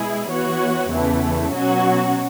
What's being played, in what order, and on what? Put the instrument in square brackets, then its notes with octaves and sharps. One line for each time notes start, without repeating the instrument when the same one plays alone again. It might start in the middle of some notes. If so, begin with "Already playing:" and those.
Already playing: [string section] B2 G#3 E4 G#4
E3 B3 F#4 C#5
E2 C#3 E3 A3
B2 F#3 C#4 F#4